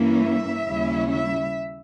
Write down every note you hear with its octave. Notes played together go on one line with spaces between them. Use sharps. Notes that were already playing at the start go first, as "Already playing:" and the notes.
Already playing: G2 E3 A#3 C#4 E4
E5
D#2 C#3 G3 C#4 E4
E5